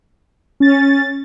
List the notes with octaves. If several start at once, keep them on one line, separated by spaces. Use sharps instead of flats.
C#4 A6